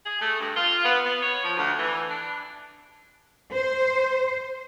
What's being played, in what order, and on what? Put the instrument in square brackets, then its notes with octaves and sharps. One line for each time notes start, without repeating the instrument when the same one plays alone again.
[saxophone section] G#4
A3
G2
F4
B3
B3
C#5
F3
D2
E3
D4
[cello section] C5